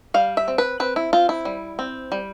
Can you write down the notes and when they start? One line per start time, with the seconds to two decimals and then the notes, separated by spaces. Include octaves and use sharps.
0.14 G3 F5
0.37 E5
0.48 C4
0.58 B4
0.80 C4 B4
0.96 E4
1.13 C4 F4
1.29 E4
1.45 G3
1.79 C4
2.12 G3